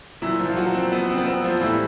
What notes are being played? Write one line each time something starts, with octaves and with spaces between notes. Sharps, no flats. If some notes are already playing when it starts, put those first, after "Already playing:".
A#2 E3 F#3 E4
F3 F4
F4
F#3 F#4
C4
B3
C4
B3
C4
F3 F4
A2 E3 G3 E4